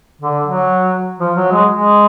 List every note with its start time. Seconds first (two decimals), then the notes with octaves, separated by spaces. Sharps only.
0.21 D3
0.46 F#3
1.20 F3
1.36 F#3
1.52 G#3
1.69 G#3